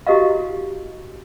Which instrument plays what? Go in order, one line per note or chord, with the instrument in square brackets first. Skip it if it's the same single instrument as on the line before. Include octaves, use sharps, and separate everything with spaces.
[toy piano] E4 F#4 G4 A#4 D#5 F5